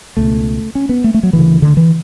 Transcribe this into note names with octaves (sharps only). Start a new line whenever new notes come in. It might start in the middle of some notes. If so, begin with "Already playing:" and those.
C#2 B2 A3
C#4
B3
A3
A3
F#3
D2 C#3 E3
D3
E3